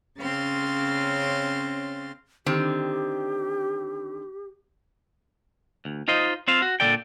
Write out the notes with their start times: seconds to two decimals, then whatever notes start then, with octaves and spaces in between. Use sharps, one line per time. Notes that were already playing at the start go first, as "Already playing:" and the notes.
0.19 C#3 C4 C#4 F5 C6 A6
2.46 D3 D#3 C4 G4
5.85 D2
6.08 D#4 F4 C5 D#5
6.48 C4 F4 C5 F5
6.62 F#4
6.80 A#2 D3 F#3 A4 D5 G5